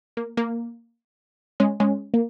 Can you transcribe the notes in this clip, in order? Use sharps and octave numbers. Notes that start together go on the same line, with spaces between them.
A#3
A#3
G#3 C#4
G#3 C#4
A#3